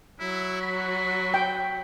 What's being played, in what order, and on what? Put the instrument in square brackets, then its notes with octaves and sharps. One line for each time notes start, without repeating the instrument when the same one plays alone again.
[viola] F#3 F#4 [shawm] E4
[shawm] B5
[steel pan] G5